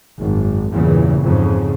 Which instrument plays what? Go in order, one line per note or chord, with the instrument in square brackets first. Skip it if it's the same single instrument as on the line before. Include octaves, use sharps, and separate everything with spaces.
[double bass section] G#1 F#2
E2 G2 A#2 C#3 E3
F2 G#2 C#3